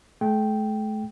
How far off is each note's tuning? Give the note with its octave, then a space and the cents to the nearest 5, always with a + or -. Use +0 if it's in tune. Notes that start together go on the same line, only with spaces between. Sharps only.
A3 -40 G5 -5